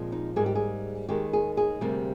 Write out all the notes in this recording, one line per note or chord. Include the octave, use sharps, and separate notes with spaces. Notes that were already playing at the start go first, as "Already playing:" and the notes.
Already playing: A#2 F3 G#3 C4
D#4
G#2 G3 A#3 G#4
G4
G#4
D#2 D#3 G#3 G4
G#4
G#4
D2 C3 G3 A#3